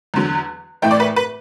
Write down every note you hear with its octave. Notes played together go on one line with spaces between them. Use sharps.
E2 D3 F#3
A2 E3 A3 G5
D5
B4
B4